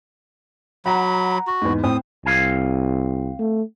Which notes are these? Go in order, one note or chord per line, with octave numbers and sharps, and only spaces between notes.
F#3 F#5 A#5 B5
F#4
E2 G#2
A2 C4 D#6
C2 C4 F5 G#5
A3